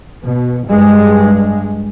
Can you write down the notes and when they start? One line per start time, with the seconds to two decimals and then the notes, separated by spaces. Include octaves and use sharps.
0.24 B2
0.69 G2 G#3